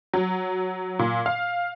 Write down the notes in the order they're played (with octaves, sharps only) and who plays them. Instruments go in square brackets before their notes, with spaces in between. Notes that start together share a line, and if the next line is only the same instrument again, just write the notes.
[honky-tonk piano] F#3
A#2
F5